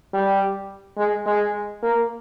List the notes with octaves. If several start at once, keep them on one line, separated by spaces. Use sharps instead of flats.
G3
G#3
G#3
A#3